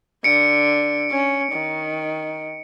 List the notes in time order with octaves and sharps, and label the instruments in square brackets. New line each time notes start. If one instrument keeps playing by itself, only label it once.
[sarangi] D3 [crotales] C#7 D7
[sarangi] C#4
D#3